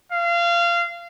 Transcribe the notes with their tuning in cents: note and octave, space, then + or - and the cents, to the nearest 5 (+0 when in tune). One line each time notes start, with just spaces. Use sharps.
F5 -25